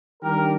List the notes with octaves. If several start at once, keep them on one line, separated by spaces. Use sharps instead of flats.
D#3 G3 D4 G4 A#4